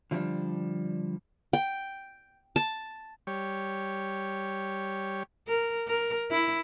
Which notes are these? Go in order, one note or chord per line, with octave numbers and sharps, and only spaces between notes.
D3 F3 G3 D4
G5
A5
G3 C#5
A#4
A#4
E4